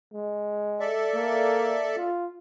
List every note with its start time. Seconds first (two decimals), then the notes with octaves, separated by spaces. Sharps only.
0.13 G#3
0.80 A4 D5 E5
1.14 A#3
1.97 F4